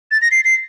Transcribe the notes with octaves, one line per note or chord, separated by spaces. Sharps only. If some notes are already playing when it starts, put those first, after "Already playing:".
A6
A#6
C7
C7